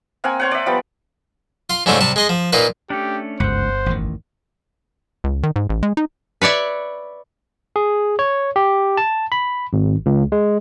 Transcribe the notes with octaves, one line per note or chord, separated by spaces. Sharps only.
A#3 C4 F#5 G#5
C5 C#5 F#5
D5 E5
F3 G3 B3
F4 C6
G#2 C#3 G3 A3 C4 F4
C3 G3 A5
G#3 D#5 C6
F3
A#2 D#4 F4 B4
A3 C#4 D4 G4
G1 C#2 F#2 C5 F#5
A1 E2 D#3
C#2
D#3
G#2
A1
G#3
D#4
B4 C#5 D5 E5
G#4
C#5
G4
A5
B5
G#1
C#2
G#3